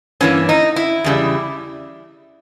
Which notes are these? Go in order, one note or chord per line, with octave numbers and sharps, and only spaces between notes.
G2 E3 A#3 C#4
D#4
E4
E2 C#3 G3